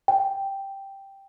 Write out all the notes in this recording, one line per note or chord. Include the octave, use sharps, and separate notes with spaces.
G5